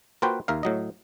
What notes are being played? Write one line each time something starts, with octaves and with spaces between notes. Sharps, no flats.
A#3 F4 F#4 B4 C5 G5
D#2 A#4 E5 F5
A2 F#3 D#5